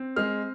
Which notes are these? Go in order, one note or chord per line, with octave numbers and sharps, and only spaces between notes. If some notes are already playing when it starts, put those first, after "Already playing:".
Already playing: C4
G#3 F6